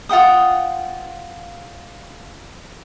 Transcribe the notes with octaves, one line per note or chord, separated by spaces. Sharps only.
F4 F#5 G5 D#6